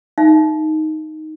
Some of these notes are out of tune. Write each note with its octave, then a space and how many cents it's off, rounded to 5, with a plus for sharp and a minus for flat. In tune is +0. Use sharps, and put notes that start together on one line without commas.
D#4 +0 E5 +40